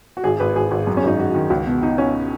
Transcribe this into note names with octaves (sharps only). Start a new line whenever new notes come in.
F#4
G#1 G#4
G#1 B4
G#1 G#4
G#1
F#2
C#4
G#1 D#4
G#1 F#4
D#3
C#2
B2
B2 D#4
B2 C#4